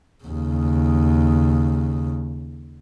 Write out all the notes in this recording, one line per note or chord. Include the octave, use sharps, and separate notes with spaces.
D#2 C#3